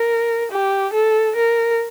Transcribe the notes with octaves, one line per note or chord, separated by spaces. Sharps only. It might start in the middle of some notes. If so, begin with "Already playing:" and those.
Already playing: A#4
G4
A4
A#4